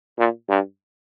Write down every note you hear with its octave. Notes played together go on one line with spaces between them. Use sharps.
A#2
G2